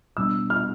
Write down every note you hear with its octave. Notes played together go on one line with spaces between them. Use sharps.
B2 G3 B3 D4 E6
F6